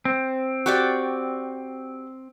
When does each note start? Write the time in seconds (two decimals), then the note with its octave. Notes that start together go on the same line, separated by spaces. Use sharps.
0.05 C4
0.66 F#4 G4 D5